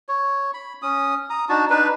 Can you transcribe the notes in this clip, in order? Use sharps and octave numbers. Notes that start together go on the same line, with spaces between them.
C#5
B5
C#4 D#6
A#5 D#6
D4 D#4 F#4 A5
D4 D#4 B4